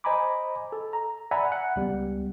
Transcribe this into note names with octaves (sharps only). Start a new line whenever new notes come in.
C5 D#5 G#5 A#5 B5 D6
A4
A#5
D5 E5 F#5 G#5 A#5 B5
F#5
C#2 G3 B3